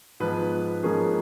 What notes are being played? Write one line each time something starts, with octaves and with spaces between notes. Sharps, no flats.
G#2 F3 B3 B4
G#2 F3 A#3 C#4 G#4